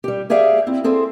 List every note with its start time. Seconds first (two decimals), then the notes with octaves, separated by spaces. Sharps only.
0.04 G3 G4
0.30 G4 G#4 D5 E5 F5
0.67 C4 E4
0.84 C4 G#4 A4 C5